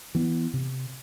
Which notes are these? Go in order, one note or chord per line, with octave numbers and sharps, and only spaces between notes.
E3 B3
C3